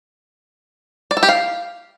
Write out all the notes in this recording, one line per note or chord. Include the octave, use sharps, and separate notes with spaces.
D5
A4
G4
F5